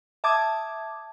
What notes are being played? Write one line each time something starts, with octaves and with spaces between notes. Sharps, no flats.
E5 A5 D6 D#6 G#6